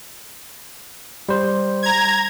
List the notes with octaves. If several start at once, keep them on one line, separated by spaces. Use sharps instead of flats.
G3 C5
A#5 G#6